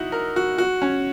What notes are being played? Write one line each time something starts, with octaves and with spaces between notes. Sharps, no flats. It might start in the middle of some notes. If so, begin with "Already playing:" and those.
Already playing: D#4 E4 F#4
A#4
F#4
F#4
C#4